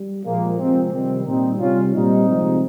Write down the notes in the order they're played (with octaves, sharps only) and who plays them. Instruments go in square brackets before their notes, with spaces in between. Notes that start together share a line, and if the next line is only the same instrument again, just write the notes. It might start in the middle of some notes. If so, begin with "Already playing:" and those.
Already playing: [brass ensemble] G3
A#2 F3 G#3 A#3
C3 F3 G#3 C4
C3 D#3 G3 C4
A#2 G3 C4 D#4
C3 G3 C#4 F4
A#2 G3 C4 D#4
C3 F3 G#3